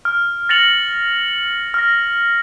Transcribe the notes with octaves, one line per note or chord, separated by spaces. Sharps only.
F6
A6 A#6 C#7 F7 F#7
F6 A#6